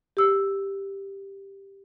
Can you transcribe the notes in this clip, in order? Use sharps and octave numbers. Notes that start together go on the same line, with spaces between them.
G4 E6